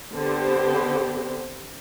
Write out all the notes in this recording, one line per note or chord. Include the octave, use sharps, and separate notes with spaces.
D3 B3 C4 G4 C5